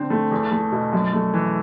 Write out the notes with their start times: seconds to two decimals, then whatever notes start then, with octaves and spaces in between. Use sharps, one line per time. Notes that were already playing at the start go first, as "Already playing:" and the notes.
Already playing: D3 C4
0.10 A3
0.31 E2
0.52 A3
0.72 B2
0.93 F#2
1.13 A3
1.34 E3